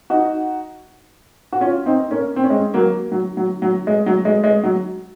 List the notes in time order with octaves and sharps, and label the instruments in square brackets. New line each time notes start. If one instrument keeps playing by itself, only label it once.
[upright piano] D#4 F#4
F#4
C#4 F4
C4 D#4
A#3 C#4
C4
C#4
G#3 C4
F#3 A#3
F#3
F#3
F#3
G#3
F#3
G#3
G#3
F#3